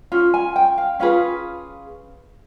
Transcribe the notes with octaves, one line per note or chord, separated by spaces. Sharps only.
C#4 F4
G#5
G5
F5
C#4 F4 G#4 B4 F5